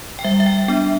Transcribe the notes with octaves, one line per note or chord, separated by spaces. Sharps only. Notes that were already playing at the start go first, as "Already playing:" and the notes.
G5
G3 E5
E5
G5
B3 D4 G5